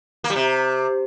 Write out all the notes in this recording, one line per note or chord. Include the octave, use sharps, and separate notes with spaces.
A#3
G3
C3